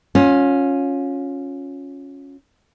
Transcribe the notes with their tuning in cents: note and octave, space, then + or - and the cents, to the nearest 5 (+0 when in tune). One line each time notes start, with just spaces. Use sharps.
C#4 +0 F4 +35